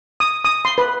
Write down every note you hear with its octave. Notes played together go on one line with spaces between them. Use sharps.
D#6
D#6
C6
B4